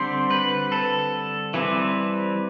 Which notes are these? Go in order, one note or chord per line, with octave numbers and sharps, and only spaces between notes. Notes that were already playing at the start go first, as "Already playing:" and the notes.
Already playing: D3 G3 C4 C5
B4
A4
E3 G3 C4